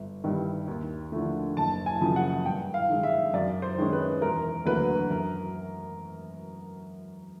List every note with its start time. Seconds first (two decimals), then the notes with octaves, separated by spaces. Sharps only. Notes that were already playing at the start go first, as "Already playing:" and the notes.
Already playing: G1
0.24 G2 D#3 G3
0.68 D#2
1.12 D3 F3 A3
1.57 F#1 A5
1.86 G#5
2.01 F#2 C#3 F3
2.16 F#5
2.45 G2 G5
2.74 F5
2.89 D#3 G#3
3.03 E5
3.33 F#2 D5
3.62 C5
3.78 D#3 G#3 C#4
3.93 B4
4.21 E1 A#4
4.66 D2 D3 F#3 A#3 B4
5.10 F#2 A#4